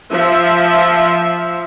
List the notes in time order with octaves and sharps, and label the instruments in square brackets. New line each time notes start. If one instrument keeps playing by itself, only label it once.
[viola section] F3 E5